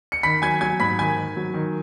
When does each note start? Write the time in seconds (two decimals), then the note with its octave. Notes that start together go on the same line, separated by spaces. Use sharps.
0.12 C#7
0.23 D#3 B5 B6
0.42 F#3 G#5 G#6
0.61 F#3 G#5 G#6
0.79 G#2 B5 B6
0.99 D#3 G#5 G#6
1.17 D#3
1.36 F#3
1.54 D#3